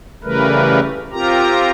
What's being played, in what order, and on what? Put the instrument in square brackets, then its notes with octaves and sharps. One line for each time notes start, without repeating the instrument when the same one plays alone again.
[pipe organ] C#3 E3 G3 A3 A#4 B4
C4 F4 G4 A#4 A#5